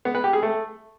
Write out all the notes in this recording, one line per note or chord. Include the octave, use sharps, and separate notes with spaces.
B3
B4
G4
G#4
A3